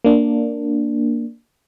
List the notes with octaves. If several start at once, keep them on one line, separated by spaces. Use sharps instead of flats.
A#3 D4